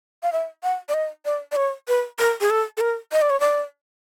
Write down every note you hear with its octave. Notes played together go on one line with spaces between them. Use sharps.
F5
E5
F#5
D5
D#5
D5
D5
C#5
B4
A#4
G#4
A4
A4
A#4
D#5
D5
C#5
D5